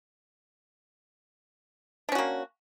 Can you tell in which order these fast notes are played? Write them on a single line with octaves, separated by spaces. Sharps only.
D4 C#4 F#4 A#3